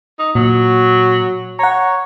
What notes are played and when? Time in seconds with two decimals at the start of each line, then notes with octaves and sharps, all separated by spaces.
0.19 D#4
0.35 A#2 F#3
1.59 C#5 F#5 A#5